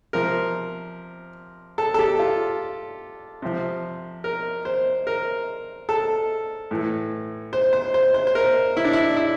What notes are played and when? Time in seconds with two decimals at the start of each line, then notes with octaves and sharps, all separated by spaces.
0.13 C3 F3 A#4
1.78 A4
1.94 A4
1.99 G4
2.19 F4
3.42 C3 F3
4.24 A#4
4.65 C5
5.07 A#4
5.89 A4
6.71 A2 E3
7.53 C5
7.73 C5
7.94 C5
8.14 C5
8.27 C5
8.35 A#4
8.77 E4
8.85 D4
8.93 E4
9.16 E4